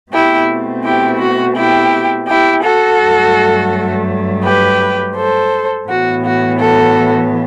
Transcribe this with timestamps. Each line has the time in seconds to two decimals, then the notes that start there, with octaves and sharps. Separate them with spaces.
0.12 B2 A3 C4 E4 G4
0.84 E4 G4
1.20 F#4
1.56 E4 G4
2.29 E4 G4
2.64 F#4 A4
3.01 G2 F#3 A3
4.44 G4 B4
5.16 A4 C5
5.89 A2 E3 B3 F#4
6.25 F#4
6.60 F#4 A4